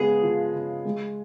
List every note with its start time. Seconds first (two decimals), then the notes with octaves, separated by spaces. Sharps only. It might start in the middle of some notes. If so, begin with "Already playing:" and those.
Already playing: C#3 G#3 B3 G#4
0.22 F3
0.54 C#3
0.85 G#3